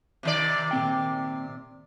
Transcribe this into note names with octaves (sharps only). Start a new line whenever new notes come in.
C3 D#3 D5
A#2 C4 G5